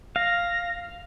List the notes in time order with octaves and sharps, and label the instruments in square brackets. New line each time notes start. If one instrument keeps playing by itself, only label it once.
[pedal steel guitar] F5 [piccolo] A#6